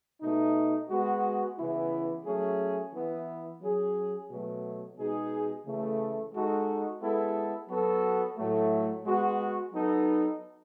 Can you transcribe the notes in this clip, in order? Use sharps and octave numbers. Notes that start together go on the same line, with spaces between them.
B2 A3 D#4
G#3 B3 F#4
C#3 E3 B3 E4
F#3 A3 C#4 G#4
E3 B3 E4
F#3 C#4 G#4
B2 F#3 A3
B2 G#3 D#4 G#4
C#3 E3 A3
G#3 D#4 F#4 A4
G#3 B3 E4 A4
F#3 B3 F#4 A4
A2 F#3 A3
G#3 B3 F#4
F#3 B3 D#4 A4